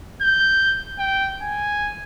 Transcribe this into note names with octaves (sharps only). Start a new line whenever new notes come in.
G6
G5
G#5